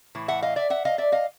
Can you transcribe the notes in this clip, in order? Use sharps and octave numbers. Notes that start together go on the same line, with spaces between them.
A2 E3
E5 F#5
D#5 F5
D5 E5
E5 F#5
D#5 F5
D5 E5
D#5 F5